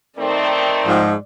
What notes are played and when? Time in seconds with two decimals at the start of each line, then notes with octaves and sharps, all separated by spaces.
0.18 D#3 A3 C4 D5
0.86 G#2 F3